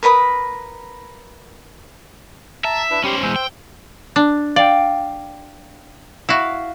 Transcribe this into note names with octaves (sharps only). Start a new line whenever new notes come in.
A#4 B4 B5 D#6
E5 A5 A#5
D4 E4 B4
G3 C#4 G4 C5 B5
E2 G#3 C5 E6
G5
D4
D5 F5 G5
E4 F#4 F5